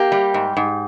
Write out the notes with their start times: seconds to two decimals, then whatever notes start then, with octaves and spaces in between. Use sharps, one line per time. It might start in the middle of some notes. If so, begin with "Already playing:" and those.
Already playing: A#3 G4
0.12 G3
0.34 G#2
0.57 G#2